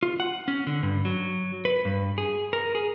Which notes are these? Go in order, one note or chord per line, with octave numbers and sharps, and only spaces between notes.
F4
F#5
C#4
D3
G2
F#3
B4
G2
G#4
A#4
G#4